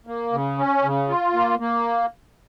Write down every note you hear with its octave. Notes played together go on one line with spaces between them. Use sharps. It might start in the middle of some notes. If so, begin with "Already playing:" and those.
A#3
C#3
C#4
C#3
F4
A#3
A#3